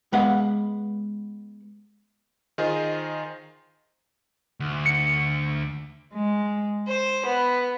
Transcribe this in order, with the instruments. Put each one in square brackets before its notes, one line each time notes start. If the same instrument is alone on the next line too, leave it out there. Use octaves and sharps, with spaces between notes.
[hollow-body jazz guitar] G#3 B3 B4 F5 F#5
[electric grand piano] D#3 F4 G#4 C5 D#5
[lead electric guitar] D2
[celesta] C#7
[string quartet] G#3
C5
B3